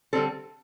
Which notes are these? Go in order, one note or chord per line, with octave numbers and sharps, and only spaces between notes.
D3 G3 C4 A4